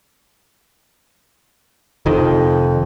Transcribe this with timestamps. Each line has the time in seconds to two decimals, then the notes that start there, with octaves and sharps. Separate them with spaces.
2.06 F1 F2 D#3